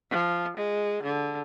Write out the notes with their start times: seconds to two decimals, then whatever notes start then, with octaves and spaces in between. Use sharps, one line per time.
0.10 F3
0.57 G#3
1.03 D3